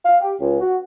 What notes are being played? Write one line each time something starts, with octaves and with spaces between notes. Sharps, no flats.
F5
G4
C#2
F#4